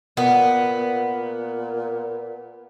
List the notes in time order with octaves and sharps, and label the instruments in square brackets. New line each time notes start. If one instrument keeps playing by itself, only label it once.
[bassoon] A#2 [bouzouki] B3